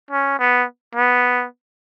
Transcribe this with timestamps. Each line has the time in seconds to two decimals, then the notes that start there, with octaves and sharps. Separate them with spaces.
0.11 C#4
0.39 B3
0.95 B3